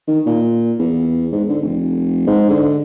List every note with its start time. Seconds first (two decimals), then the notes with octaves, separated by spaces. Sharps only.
0.08 D#3
0.26 A#2
0.79 E2
1.32 G#2
1.48 D3
1.62 F1
2.26 G#2
2.49 D3